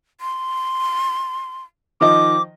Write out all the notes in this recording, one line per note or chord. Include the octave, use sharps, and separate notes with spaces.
C6
D#3 F3 D#5 D6